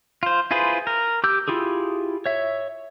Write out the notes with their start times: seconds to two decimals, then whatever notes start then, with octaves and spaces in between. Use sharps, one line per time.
0.23 F4 C5
0.51 E4 F4 G#4 B4 C5
0.87 A#4
1.24 G4 D6 E6 G6
1.48 E4 F4 G4 G#4
2.26 C#5 E5